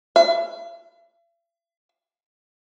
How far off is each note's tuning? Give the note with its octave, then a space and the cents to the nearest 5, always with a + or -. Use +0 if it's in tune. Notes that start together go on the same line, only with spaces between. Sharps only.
E5 +45